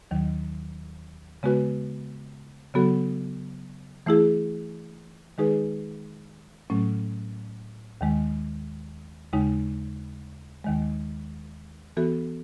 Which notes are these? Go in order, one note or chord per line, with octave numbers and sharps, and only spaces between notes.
D#2 D#3 F#3
C#3 G#3 B3 F#4 B4
C#3 F#3 B3 F#4 A4
E3 A3 E4 G#4
D#3 G#3 D#4 G#4 B4
A2 F#3 A3 C#4
D#2 D#3 G#3
D#2 C#3 G#3 D#4
D#2 D#3 G#3
E3 B3 F#4 A4